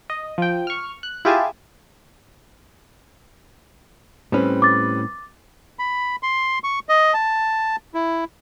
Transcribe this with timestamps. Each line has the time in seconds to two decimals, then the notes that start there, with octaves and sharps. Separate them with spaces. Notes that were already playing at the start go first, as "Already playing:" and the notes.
0.10 D#5
0.38 F3 G5
0.67 C#6 F6
1.03 F#6
1.25 E4 F4 G4 G#4 G#5 A5
4.32 A2 G3 C4 C#4 B4
4.62 D6 A6
5.79 B5
6.23 C6
6.64 C#6
6.89 D#5
7.14 A5
7.94 E4